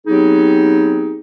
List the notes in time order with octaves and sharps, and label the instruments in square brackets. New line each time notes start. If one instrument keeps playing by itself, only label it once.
[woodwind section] F#3 B3 C4 D#4 G4 G#4